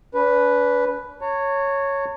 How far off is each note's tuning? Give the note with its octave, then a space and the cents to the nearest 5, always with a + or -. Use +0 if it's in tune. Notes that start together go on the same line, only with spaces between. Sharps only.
D4 -40 B4 +0
C#5 +0 A5 +45